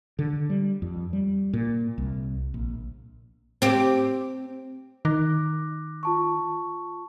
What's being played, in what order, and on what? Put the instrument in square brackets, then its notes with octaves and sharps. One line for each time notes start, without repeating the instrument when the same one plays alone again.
[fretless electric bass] D3
G3
F2
G3
A#2
C2
A#1
[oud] C4 G4
[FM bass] D#3 [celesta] D6 F#6 A#6
[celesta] F4 A5 C#6